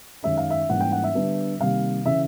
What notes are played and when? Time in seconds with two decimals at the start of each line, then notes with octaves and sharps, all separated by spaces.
0.23 F#2 D#3 G#3 C#4 E5
0.37 F5
0.50 E5
0.69 G#2 E3 G3 A#3 C#4 F#5
0.80 G5
0.92 F#5
1.04 E5
1.15 D3 G3 B3 D4
1.59 C3 D#3 G3 A#3 F5
2.05 C#3 E3 E5